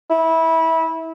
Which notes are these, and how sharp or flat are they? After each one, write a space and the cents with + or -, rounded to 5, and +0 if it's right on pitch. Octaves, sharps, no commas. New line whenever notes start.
E4 -20